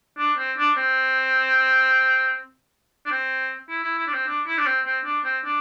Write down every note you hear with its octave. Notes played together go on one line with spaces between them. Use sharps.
D4
C4
D4
C4
D4
C4
E4
E4
E4
D4
C4
D4
E4
D4
C4
C4
D4
C4
D4